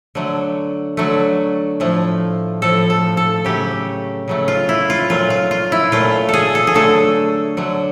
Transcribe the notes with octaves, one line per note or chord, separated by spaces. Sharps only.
D3 F#3 A3
D3 F#3 A3
A2 F3 A3
A2 F3 A3 A4
A4
A4
C#3 F#3 A3 G4
C#3 F#3 A3
F4
E4
F4
A#2 F#3 A3 F4
F4
F4
E4
A#2 F#3 A3 F4
G#4 A4
A4
G#4
D3 F#3 A3 A4
D3 F#3 A3